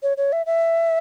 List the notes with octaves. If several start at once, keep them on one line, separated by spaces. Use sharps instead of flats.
C#5
C#5
E5
E5